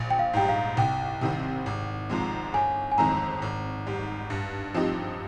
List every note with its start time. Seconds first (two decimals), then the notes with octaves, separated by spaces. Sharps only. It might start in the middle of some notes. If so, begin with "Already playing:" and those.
Already playing: A#1
0.10 G5
0.19 F5
0.33 G#2 G3 G5
0.49 F5
0.77 C2 G5
1.21 C3 D#3 G3 C4
1.66 G#1
2.10 G#2 F3 G#3 C4
2.54 G1 G#5
2.92 G#5
2.98 F2 D#3 G#3 C4 A#5
3.42 G#1
3.87 G#2 G3
4.30 G2
4.74 F3 C4 D#4 G4